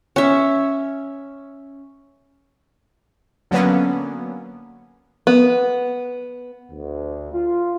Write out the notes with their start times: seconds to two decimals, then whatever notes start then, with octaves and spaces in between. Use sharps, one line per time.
0.16 C#4 E5
3.51 D3 F#3 A#3 B3 C#4
5.27 B3
6.71 D2
7.32 F4